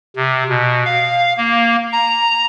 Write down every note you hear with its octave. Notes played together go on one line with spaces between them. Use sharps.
C3
B2
F5
A#3
A#5